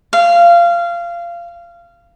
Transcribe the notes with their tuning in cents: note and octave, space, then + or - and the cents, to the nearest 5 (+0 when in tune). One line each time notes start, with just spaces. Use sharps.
F5 -20